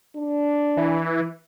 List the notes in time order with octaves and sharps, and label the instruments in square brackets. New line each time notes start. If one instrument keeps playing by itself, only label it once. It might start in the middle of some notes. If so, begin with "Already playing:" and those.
[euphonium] D4
[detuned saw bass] E3